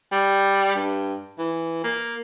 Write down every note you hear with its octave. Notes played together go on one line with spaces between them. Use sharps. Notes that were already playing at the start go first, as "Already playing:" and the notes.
G3
G2
E3
A#3